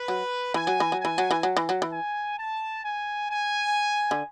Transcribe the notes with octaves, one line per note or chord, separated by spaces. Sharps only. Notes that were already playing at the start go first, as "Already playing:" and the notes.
Already playing: B4
F#3
E3 G#5
F#3
E3
F#3
E3 G#5
F#3
E3
F#3
E3
F#3
E3
G#5
A5
G#5
G#5
D3